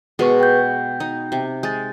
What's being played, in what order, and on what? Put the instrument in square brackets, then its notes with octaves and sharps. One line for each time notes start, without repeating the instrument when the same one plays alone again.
[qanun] B2 G#3 [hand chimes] G#4 B4 C#6
[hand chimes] G5 G6
[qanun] D#4
C3
[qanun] G#3 [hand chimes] G6 A6